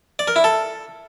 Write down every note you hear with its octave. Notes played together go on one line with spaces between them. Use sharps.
D5
A#4
E4
A4